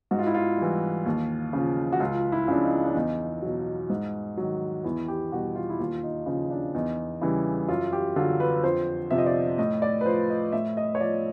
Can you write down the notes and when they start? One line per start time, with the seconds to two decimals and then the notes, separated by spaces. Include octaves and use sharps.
0.11 G#2 F#4
0.19 F4
0.27 E4
0.34 F4
0.58 E3 G3
1.06 D#2
1.53 C#3 F3
1.92 F#4
2.00 C#2 F4
2.32 E4
2.48 C#3 F3 D4
2.63 D#4
2.86 D4
2.95 E2 D#4
3.42 B2 F#3
3.90 G#2
4.37 D#3 F#3
4.84 E2 E4
5.08 G4
5.32 B2 G3 F#4
5.55 F4
5.70 E4
5.79 D#2 F4
6.03 D#4
6.26 C#3 F3
6.51 D4
6.74 E2 D#4
7.21 C#3 E3 G3 E4
7.68 F#2 F4
7.93 G4
8.16 D3 F#3 F4
8.40 B4
8.63 F2 C5
9.11 C3 F3 E5
9.18 D#5
9.26 D5
9.58 A2 D#5
9.82 D5
10.01 B4
10.06 F3 C5
10.30 D#5
10.52 A2 E5
10.77 D#5
10.95 C#5
11.01 F3 D5